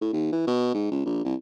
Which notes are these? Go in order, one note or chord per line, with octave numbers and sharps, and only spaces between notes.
A2
D#2
E3
B2
G#2
C#2
A#1
C2